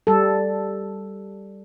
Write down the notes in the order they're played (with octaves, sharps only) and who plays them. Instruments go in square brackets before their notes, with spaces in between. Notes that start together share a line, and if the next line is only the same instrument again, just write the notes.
[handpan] G3 A4